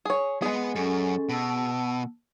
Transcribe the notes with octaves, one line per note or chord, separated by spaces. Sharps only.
G#4 C#5
G#3 B3 G#4
F#2 C#4 A4
B2 A5 E6